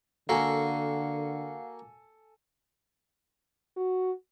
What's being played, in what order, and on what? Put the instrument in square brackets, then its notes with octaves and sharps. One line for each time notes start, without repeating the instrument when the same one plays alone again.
[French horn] D3 [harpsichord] A#3 F#4 A#4 [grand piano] A4 G#5 [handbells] F5 F#5
[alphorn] F#4